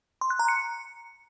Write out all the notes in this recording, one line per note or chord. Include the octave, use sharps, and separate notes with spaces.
C6
F#6
A#5
C#7